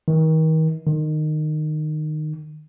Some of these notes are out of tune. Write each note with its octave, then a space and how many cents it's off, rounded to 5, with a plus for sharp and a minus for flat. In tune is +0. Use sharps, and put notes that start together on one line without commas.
D#3 +35
D#3 -20